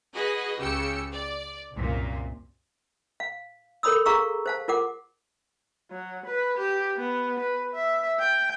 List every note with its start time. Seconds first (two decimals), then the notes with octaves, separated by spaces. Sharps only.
0.14 F#4 G#4 B4 D#5
0.59 C#2 C#3 G4 E6 C#7
1.12 D5
1.73 C2 F#2 A#2
3.20 F5
3.83 A4 A#4 C#5 B5 D#6 E6
4.06 G#4 F5 A#5 C#6 E6
4.46 C5 F5 A5
4.68 F4 A#4 F#5 D6
5.91 F#3
6.26 B4
6.58 G4
6.97 B3
7.40 B4
7.74 E5
8.20 G5